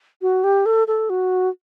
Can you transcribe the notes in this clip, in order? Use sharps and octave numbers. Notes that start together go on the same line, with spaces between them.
F#4
G4
A4
A4
F#4